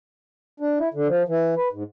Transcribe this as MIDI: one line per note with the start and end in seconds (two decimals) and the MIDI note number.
0.60 0.78 62
0.79 0.89 64
0.94 1.08 50
1.08 1.23 53
1.28 1.55 52
1.57 1.68 71
1.73 1.83 44